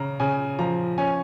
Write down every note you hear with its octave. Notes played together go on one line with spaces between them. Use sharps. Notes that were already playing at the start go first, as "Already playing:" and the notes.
Already playing: C#3 A#5
C#3 G#5
F3 A#5
C#4 G#5